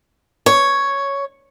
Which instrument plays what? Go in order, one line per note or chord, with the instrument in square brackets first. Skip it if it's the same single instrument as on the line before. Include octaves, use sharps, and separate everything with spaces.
[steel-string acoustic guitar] C#5